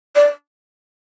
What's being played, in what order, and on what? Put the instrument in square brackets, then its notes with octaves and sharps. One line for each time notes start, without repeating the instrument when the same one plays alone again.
[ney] D5